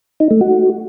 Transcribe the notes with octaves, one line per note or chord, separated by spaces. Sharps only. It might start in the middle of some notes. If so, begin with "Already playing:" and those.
D#4
A3
F#4